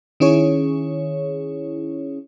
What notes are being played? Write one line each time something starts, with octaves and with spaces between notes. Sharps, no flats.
D#3 C#4 E4 G#4 C#5